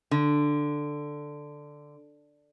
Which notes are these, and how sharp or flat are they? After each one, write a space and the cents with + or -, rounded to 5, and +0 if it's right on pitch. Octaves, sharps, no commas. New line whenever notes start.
D3 +5